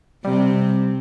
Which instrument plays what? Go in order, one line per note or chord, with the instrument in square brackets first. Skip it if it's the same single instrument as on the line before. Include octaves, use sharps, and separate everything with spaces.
[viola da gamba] C3 C4 [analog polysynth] G3